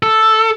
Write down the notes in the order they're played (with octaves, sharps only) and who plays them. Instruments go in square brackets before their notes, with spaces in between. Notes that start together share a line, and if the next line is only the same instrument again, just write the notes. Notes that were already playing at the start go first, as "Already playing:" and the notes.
[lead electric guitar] A4